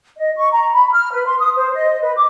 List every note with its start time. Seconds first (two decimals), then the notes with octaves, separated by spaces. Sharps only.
0.17 D#5
0.38 C#6
0.52 A#5
0.72 B5
0.93 F6
1.12 B4
1.27 C6
1.39 D#6
1.56 C5
1.74 D#5
2.02 B4
2.16 D6